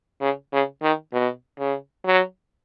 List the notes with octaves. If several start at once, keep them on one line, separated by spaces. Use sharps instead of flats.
C#3
C#3
D#3
B2
C#3
F#3